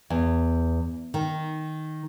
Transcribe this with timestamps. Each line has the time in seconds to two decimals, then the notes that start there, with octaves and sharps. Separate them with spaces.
0.10 E2
1.14 D#3